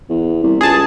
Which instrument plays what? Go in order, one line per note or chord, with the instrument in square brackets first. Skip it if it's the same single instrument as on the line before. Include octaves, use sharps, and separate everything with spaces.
[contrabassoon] E2
C2
[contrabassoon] C#2 [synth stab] G#4 A5